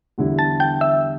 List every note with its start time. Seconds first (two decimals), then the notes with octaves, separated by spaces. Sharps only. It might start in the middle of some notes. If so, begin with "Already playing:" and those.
0.18 E2 D3 G3 E4
0.39 A5 A6
0.60 G5 G6
0.81 E5 E6